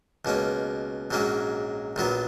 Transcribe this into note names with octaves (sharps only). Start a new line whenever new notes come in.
C#2 B2 A#3 C#4
A#1 G#2 F#3 A#3 C#4
A#1 A#2 F#3 B3